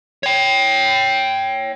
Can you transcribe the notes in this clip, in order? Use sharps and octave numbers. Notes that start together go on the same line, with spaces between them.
C#5 G5